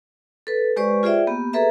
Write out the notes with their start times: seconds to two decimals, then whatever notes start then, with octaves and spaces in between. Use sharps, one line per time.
0.47 A4 B4
0.76 G#3 G4 B4 C5 D5 C#6
1.03 F4 G#4 C5 D5 E5 G5
1.27 A#3 B3 G4
1.53 G#4 A4 B4 E5 A#5